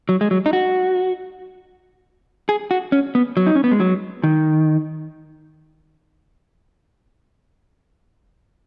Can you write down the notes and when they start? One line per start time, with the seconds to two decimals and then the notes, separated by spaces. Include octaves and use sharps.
0.09 F#3
0.21 G#3
0.31 F#3
0.46 D#4
0.53 F#4
2.49 G#4
2.71 F#4
2.92 C#4
3.15 B3
3.37 F#3
3.47 D#4
3.56 C#4
3.64 B3
3.72 G#3
3.80 F#3
4.24 D#3